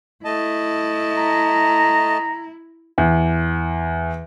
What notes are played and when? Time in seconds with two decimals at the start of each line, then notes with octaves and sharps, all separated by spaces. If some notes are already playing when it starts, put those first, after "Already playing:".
0.25 A3 E4 D#5 A5
1.17 A#5
2.98 E2